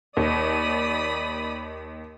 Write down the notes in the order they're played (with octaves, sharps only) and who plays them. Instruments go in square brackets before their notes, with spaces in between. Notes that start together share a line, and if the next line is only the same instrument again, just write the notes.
[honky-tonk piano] D#2 [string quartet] D5 B5 D#6